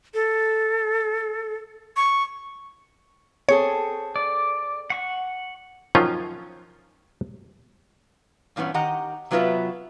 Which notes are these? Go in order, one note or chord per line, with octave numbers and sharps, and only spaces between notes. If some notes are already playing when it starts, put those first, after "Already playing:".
A4
C#6
C4 G#4 A4 C#5
D5
F#5 C#6
D#3 F3 F#3 C#4 F4
G2 A#2 E3 B3 C#4
D#3 G4 D#5 F#5 A#5
C3 F#3 B3 F4 B4 E5